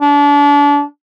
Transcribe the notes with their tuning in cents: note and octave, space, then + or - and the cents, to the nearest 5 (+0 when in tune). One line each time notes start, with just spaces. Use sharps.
D4 -30